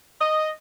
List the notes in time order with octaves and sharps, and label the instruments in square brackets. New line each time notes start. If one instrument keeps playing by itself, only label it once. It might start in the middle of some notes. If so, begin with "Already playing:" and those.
[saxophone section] D#5